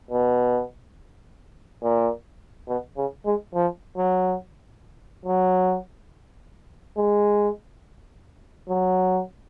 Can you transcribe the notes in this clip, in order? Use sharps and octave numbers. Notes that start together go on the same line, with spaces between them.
B2
A#2
B2
C#3
G#3
F3
F#3
F#3
G#3
F#3